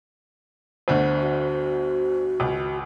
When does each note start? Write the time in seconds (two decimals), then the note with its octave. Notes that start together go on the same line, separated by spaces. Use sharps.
0.88 G1 D2 D3 C5
1.20 F#4
2.40 G#1 C#2